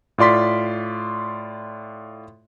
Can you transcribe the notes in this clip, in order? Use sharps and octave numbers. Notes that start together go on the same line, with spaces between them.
A2 F4 D5 C6 B6